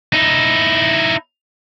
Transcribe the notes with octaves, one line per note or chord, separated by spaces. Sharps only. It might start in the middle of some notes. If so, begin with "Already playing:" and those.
D#4 E4